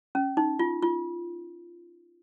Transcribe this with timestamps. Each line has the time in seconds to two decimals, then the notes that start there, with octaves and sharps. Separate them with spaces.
0.15 C#4
0.37 D#4
0.59 F4
0.82 F4